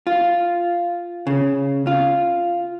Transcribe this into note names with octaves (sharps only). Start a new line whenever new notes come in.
F4
C#3
F4